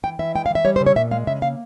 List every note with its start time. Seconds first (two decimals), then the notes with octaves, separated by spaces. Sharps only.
0.03 E3 G5
0.19 E3 E5
0.35 G#3 G5
0.46 F5
0.50 E3 E5
0.65 G3 C#5
0.76 C5
0.81 C#3
0.86 C#5
0.96 A#2 E5
1.11 G#3 F5
1.27 C#3 E5
1.42 A#3 F5